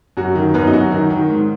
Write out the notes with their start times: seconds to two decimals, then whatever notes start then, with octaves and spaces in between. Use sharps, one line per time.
0.17 F#2 F#4
0.35 D#3
0.54 F#2 B3 B4
0.67 D#4
0.73 F#2 F#4
0.92 D#3
1.10 D#3
1.29 G#2